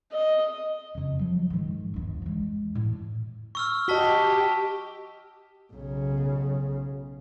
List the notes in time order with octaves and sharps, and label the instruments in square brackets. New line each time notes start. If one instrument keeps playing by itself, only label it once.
[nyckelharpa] D#5
[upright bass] F2 C#3
F3 F#3
G#2 D#3
G1 D#2
E2 G#3
A2
[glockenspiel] C#6 E6 F6
[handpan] F#4 D#5 [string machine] G4 [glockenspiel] A5 B6 G7
[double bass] B1 C#3